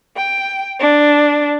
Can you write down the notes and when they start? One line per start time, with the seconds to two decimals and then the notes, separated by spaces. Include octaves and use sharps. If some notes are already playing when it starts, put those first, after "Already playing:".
0.17 G5
0.79 D4